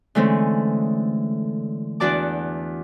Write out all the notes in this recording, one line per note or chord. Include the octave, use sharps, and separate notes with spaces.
D3 E3 G#3 A3 C4 C#4
E2 D4 F#4 D5 A5 D6